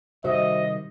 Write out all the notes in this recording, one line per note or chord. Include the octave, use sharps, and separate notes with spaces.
C3 D#3 G3 F#4 C5 D#5 E5